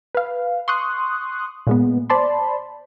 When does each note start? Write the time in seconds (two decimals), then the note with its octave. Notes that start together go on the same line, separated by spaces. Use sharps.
0.15 B4 F5
0.68 C6 C#6 D#6 F#6
1.67 A#2 G#3 B3
2.10 C5 D5 A5 B5 C6